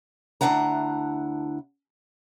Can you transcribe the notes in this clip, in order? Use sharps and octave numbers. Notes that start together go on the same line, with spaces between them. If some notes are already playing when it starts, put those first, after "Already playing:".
D2 E3 D4 E4 F#5 A#5